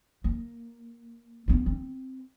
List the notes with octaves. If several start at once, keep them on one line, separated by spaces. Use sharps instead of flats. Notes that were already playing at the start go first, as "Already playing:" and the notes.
A#3
B3 D4
C4